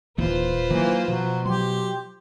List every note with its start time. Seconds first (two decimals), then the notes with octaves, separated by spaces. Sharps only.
0.18 D#1 D#2 E3 F4 B4 C5
0.70 D#3 E3 F#3 A#3
1.08 B2 F3 F#3
1.46 F#3 G4 C6